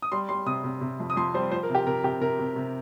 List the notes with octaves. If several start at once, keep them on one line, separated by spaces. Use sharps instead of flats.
D#6
G3 C6
G3 C6
C3 D#6
C3
C3
F2
D#6
F2 C6
G3 C5
F3 C5
A#4
C3
G4
C3 A#4
C3 G4
C3 A#4
C3
C3